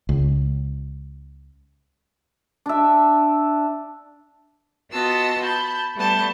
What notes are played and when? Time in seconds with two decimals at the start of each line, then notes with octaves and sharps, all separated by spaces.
0.09 C#2
2.66 D4 E5
4.92 B3 F4 F#4 D#5 A5 E6
5.43 A5 B5 G6
5.97 G3 A3 B3 A5 G6